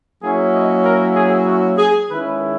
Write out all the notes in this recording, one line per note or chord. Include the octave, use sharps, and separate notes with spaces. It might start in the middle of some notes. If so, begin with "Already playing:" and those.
F#3 A#3 C#4 E4 G#4
D#5
A#4
G#4
F#4
G#4
D#3 G#3 C#4 E4 B4